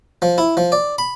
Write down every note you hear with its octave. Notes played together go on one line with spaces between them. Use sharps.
F3
E4
F3
D5
B5